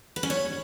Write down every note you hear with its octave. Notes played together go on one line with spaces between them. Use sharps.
B4
C#4
C#5